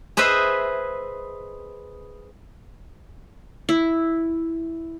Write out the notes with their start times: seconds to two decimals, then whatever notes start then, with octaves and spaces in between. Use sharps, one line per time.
0.17 G#4 B4 C5 D#5 E5
3.69 E4